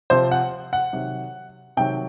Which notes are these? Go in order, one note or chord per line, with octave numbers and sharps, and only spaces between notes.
C3 F3 C5
F#5
F#5
C3 D#3 F#3
C3 D#3 F#3 G5